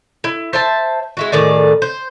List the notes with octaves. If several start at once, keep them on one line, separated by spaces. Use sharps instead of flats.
E4
C5 E5 A5
G#3 E4 F#4
A2 D#3 G#4 D5
C5